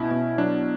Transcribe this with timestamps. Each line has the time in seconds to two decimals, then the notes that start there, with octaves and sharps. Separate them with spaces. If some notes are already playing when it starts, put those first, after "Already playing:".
Already playing: B2 C#4 E4
0.11 B2
0.38 F#3 D4